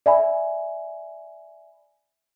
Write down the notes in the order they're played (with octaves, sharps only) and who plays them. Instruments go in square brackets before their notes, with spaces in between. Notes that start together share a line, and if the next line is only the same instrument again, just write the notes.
[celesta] D5 E5 G#5 B5